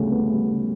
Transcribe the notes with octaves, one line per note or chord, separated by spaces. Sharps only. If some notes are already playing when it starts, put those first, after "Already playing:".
Already playing: D2 C#3 G3 B3
B3
G3
C#3